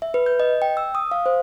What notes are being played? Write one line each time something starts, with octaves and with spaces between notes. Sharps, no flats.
E5
B4
G6
D#5
G5
E6
D#6
F5
C5